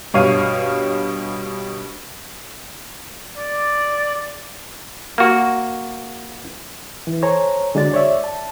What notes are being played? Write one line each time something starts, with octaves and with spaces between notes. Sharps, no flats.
G2 B2 C#5 F5 D#7
D5
A#3 F#4
E3
A4 C5 C#5 G#5 A#5
D3 G#3 F#4 D5 A6
C#5 D5 E5
A5